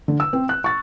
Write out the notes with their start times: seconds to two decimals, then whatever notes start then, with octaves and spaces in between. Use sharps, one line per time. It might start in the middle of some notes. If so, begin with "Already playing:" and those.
0.08 D3
0.20 E6
0.33 C4
0.49 F#6
0.64 C#6 A6